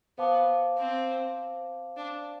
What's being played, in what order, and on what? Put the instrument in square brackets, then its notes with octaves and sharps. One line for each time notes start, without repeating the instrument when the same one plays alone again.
[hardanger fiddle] B3 [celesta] C5 F5 A5 D6
[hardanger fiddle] C4
D4